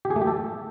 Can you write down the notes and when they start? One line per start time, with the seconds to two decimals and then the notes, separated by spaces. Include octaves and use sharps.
0.05 G4
0.10 G#4
0.16 A3
0.22 G4
0.27 A4